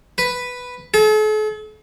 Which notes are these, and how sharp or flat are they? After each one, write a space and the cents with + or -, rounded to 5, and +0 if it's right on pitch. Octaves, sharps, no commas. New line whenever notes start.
B4 +0
A4 -45